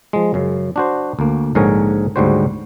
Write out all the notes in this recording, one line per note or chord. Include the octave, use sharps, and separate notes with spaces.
F3 G#3
F#2 C#3
D4 F#4 C5
D2 A#3
A#1 G#2 D3 A#4 C#5 G#5
D2 G#2 C#3 G3 F#4 C5